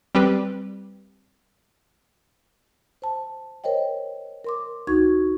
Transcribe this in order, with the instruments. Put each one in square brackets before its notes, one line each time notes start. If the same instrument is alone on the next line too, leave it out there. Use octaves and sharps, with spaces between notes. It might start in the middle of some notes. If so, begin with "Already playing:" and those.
[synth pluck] G3 C4 G4 B4
[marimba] C5 A5
A#4 C5 C#5 D#5 G5
A#4 C6 D6
D2 D#4 F#4 C#6 G#6